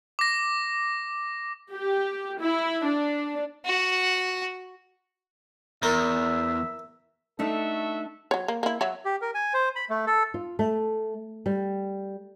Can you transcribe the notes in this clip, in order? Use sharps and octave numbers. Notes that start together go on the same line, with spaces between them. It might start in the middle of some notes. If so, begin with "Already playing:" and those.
D6 A#6
G4
E4
D4
F#4 F#5
E2 A#4 E5
A3 D4 D#4 F#4 A4 E5
F#3 C#5
A#3
A#3 E4
F#3 C#5 E5
G4
A#4
G#5
C5
B5
A3
A4
F4
A3
G3